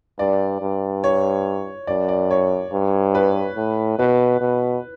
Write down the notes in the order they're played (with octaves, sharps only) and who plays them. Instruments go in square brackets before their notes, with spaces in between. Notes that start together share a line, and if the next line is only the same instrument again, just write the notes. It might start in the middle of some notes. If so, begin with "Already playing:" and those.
[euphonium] G2 [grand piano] D5
[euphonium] G2
[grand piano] C#5
[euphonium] F#2 [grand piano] D5
[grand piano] D5
C#5
[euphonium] G2
[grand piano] B4
[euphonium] A2
[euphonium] B2 [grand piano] B4
[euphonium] B2